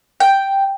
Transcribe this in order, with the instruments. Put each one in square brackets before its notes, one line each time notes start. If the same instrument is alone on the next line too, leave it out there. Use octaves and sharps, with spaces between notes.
[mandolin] G5